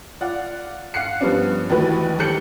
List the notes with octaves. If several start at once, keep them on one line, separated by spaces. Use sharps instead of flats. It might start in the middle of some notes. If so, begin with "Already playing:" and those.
F4 D5 F#5
F5 F#5 F#6 C7 C#7
G2 F3 G3 B3 C#4 D4
A#1 D#2 E3 A3 F#4 B4
G#1 G4 A4 G6 C#7 F#7